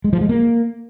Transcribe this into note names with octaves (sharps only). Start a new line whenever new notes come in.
G#3
F3
G#3
A#3